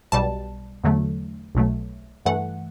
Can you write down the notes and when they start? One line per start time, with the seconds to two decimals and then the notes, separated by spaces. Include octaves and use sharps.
0.12 B1 B2 G3 A5
0.84 E2 D3 F#3 A3
1.55 B1 B2 F#3 A3
2.25 G2 E3 A3 F#5